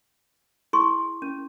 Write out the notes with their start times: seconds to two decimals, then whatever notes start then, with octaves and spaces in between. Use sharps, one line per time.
0.73 E4 G#4 C6 C#6
1.22 C#4